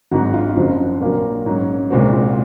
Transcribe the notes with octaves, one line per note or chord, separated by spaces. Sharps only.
G#1 G#2 F#3 F#4
F4
F4
F#1 F#2 F3 C4 F#4
A#1 A#2 F#3 A#3
G#2 F#3 C#4
C2 A#2 G#3 C4 F#4
F4